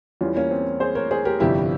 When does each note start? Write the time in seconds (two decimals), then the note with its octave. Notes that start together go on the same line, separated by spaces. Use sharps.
0.21 E2 E3 G3 C#4 F4
0.36 A#3 C#4
0.51 C4
0.80 G#4 C5
0.95 A#4 C#5
1.11 G#4 C5
1.25 G4 A#4
1.40 G1 F2 C3 G3 E4 G4